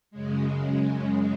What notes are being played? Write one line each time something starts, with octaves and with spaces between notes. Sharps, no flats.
F#2 C#3 G#3